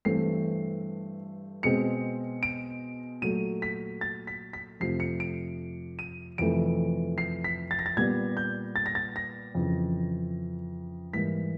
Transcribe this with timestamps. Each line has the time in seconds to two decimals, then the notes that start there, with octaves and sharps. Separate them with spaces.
0.05 G2 E3 A3 C4 C7
1.63 B2 G#3 C4 C#7
2.43 D7
3.22 A#2 F#3 A3 D#7
3.62 B6
4.01 A6
4.27 B6
4.53 B6
4.80 F2 C3 F3 A3 C7
5.00 C#7
5.20 D7
5.99 D#7
6.38 F2 C3 E3 A3 D7
7.18 C7
7.44 B6
7.71 A6
7.79 A#6
7.86 A6
7.97 A#2 G3 B3 G#6
8.37 G6
8.76 A6
8.86 A#6
8.95 A6
9.16 A#6
9.55 F2 C#3 E3
11.13 G#2 E3 G3 A#3 B6